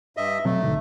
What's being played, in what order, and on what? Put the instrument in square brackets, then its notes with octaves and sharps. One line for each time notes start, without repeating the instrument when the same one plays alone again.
[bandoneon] G2 D#5 E5
[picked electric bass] B2 F#3 C4 [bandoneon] A3
[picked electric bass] G#1 D3 D#3